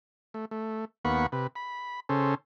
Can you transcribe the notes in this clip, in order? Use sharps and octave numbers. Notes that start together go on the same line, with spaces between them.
A3
A3
D#2 A#3 B3 F#5 B5 C#6
C3 B4
B5
C#3 C#4 A4 C5